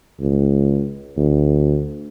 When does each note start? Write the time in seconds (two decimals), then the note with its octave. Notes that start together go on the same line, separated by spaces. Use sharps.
0.20 C#2
1.16 D2